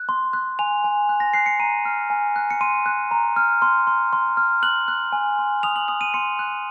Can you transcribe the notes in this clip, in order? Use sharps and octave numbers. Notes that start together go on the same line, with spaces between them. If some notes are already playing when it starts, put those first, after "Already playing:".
Already playing: F#6
C6
F#6
G#5 F7
G#5
F#6
A#6
F#6 C7
C#7
A#5 D#7
F6
G#5
F#6
C#7
C6 D#7
F#6
A#5
F6
C6
C6
C6
F6
F#6 F#7
F#6
G#5
C6
D#6 F7
F#7
D#6 F7
D#7
C6 C#7
F#6